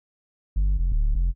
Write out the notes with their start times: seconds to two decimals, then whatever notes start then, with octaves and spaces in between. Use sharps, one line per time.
0.56 G1
0.79 F1
0.92 D1
1.15 F1